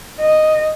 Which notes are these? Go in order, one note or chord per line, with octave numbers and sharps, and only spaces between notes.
D#5